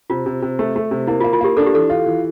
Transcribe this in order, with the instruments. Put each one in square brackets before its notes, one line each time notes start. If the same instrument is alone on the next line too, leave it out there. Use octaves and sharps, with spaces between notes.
[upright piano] C3 [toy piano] F4
[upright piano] C3
C3
A3
A3
C3
[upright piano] A#3 [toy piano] E4
[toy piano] F4
[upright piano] A#3
[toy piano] F4
[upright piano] A#3 [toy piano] G4
[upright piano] D4 [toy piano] A4
[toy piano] G4
[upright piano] E3 [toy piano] A4
[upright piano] F4
E3